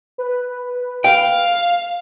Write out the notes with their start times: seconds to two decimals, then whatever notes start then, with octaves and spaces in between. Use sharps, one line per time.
0.18 B4
1.04 F5 G5